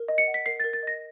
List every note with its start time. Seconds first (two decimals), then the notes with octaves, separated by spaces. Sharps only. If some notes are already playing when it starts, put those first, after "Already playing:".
Already playing: A#4
0.08 D#5
0.18 C#7
0.27 F#5
0.34 B6
0.46 A#4 C7
0.60 A#4 A6
0.73 A6
0.83 D#5 A#6